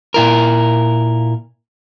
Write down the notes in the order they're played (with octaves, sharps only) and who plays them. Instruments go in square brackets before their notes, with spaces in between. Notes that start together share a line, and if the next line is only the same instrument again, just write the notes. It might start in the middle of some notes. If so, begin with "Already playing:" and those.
[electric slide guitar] A#2 E4 A#4